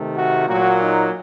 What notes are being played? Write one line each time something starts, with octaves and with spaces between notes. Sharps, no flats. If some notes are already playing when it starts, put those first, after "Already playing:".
Already playing: C3 D#3 A3
F#4
A#2 F#3 A#3 F#4
D#4